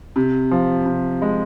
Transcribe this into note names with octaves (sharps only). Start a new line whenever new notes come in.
C3
F3
C3
G#3